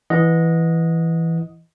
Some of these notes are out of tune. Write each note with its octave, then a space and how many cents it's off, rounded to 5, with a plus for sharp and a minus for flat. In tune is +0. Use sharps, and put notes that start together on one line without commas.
E3 +0 D#5 +0 F#5 -25